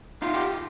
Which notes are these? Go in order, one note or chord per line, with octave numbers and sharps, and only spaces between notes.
D#4 F4
F4 G4